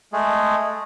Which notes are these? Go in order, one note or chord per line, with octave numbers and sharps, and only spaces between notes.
G#3 A3 G#4